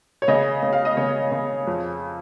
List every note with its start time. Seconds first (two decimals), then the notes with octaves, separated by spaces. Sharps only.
0.22 C#5
0.28 C#3 D#5
0.62 C#3
0.73 F5
0.85 D#5
0.97 C#3 C#5
1.32 C#3
1.67 F2